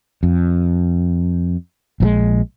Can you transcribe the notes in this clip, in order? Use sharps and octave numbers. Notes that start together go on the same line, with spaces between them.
F2
A#1 E3 G#3